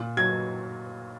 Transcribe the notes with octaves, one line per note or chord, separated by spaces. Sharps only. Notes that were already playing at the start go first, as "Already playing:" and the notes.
Already playing: A#2
F#3 G#6